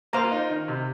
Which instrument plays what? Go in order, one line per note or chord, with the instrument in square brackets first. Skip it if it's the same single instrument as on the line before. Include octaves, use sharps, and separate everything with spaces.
[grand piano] A#3 [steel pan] C5 F5 A#5
[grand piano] F4
D#4
D#3
C3